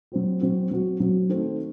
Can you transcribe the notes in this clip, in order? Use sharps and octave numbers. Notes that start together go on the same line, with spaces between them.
F#3 C4 F#4
F#3 C4 F#4
F#3 C4 F#4
F#3 C4 F#4
D#3 A3 C4